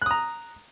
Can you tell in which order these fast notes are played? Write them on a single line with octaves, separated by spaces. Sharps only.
F#6 D#6 A#5